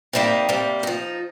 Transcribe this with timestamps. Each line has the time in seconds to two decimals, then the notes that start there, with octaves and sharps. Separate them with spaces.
0.13 C3 G3 A#3 D#4
0.49 C3 G3 A#3
0.83 F3 D#4